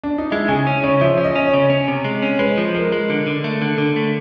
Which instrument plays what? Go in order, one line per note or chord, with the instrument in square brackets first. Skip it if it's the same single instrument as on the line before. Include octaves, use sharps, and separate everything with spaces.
[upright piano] D4
D#4
[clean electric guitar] G#3 [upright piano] E4
[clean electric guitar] C#3 [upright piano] G#4
[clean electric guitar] C#4
[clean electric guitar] C#3 [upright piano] C#5
[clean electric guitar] F3 [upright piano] E5
[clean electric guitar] C#4
[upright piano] D#5
[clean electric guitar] C#4
[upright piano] C#5
[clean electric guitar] C#3
C#4
C3
G#3
C#4
[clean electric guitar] G#3 [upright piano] B4
[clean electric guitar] F3
[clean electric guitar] G#3 [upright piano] A#4
[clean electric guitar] G#3
D3
D3
A3
D3
D3
A3